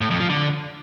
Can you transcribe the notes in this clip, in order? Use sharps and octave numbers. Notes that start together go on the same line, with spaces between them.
A2
F2
F3
D3